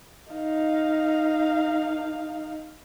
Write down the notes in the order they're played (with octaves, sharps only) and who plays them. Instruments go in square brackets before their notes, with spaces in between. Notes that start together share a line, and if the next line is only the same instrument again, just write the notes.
[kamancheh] D#4 F5